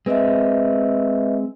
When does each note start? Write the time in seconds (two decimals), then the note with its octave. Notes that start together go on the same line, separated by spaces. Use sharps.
0.06 G#3 C4 B4 D#5 E5